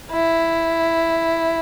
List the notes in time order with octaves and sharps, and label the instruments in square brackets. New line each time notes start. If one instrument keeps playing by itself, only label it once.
[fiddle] E4